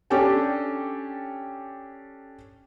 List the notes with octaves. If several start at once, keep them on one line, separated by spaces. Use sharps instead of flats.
C#4 D4 G4 A4 G5 G#5